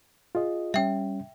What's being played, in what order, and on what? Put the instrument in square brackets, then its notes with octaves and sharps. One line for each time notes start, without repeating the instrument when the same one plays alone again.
[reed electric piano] F4 G#4 D#5
[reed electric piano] G3 C#4 [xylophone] E5 G5